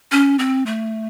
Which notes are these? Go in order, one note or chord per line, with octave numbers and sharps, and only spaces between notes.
C#4
C4
A3